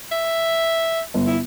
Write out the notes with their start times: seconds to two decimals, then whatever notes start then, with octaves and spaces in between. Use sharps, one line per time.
0.12 E5
1.14 G1
1.27 E4